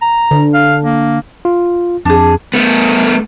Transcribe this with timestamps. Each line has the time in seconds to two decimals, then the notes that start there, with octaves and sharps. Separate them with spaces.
0.02 A#5
0.31 D3
0.54 F5
0.84 A#3
1.45 F4
2.05 F2 D4 G#4
2.54 A3 B3